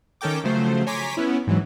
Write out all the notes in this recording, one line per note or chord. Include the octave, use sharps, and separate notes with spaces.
D#3 C#4 A4 A#4 G5 D6
C#3 F3 F#3 A3 C5
C#5 G#5 A#5 C6 D6 B6
B3 C#4 E4
G#2 E3 F#3